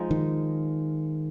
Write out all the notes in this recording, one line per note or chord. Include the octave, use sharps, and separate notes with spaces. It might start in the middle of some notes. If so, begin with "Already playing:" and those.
Already playing: F3 G#3 D#4
D#3